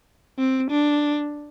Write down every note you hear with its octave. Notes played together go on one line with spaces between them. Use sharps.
C4
D4